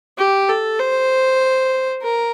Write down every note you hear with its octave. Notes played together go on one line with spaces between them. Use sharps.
G4
A4
C5
A#4